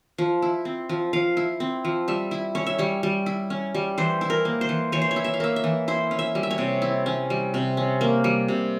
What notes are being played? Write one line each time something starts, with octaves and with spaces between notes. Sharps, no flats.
F3
E4
C4
F3
F3 F5
E4
C4
F3
G3 E5
E4
C#4 C#5
E5
G3 C#5
G3
E4
C#4
G3
E3 C5
E4
A#4
A#3
C5
E3
E3 C#5
C5
C#5
E4
E5
F5
A#3 E5
E5
E3
E4 C5
C#4
E5
G3
E5
C#5
C3
E4
C#4
G3
C3
C#4
A#3
G3
C3